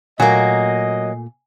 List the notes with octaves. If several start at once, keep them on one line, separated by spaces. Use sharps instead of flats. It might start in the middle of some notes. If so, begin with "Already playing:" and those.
A#2 F#3 A3 A#3 D#5 G#5